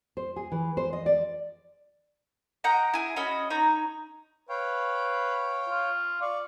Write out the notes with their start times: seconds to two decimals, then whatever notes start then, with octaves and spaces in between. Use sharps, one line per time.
0.17 C5
0.36 G#4
0.52 E3
0.77 C5
0.93 D#5
1.06 D5
2.64 D#5 F#5 G5 A#5
2.93 E4 G#4
3.16 C#4 F#4 D#5 B5
3.50 D#4 C#5 A#5
4.49 B4 C#5 F5 G5
5.70 F4
6.22 D5 F5 C#6